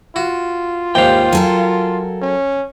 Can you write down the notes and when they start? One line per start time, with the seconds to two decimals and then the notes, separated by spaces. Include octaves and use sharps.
0.16 F4 F#4
0.95 D#2 G#2 G3 F5 G5
1.33 F#3 A4 A#4 G#5
2.22 C#4